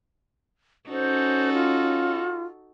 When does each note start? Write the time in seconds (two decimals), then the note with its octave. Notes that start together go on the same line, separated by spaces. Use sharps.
0.90 C#4 D#4 F#4 A4 C5
1.53 F4